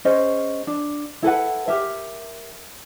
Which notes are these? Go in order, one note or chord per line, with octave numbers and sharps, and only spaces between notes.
C#4 G#4 C5 D#5
D4
E4 A4 B4 F#5
G4 A#4 E5